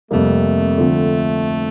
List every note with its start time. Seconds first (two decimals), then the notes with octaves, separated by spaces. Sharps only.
0.11 F2 C3 G3 A3 A#3
0.78 D3 F3 C4